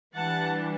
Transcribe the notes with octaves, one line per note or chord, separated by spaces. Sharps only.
E3 G3 D4 F#5 A5